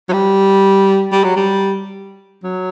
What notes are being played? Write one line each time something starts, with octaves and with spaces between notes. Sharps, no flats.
F#3
G3
G3
F#3
G3
F#3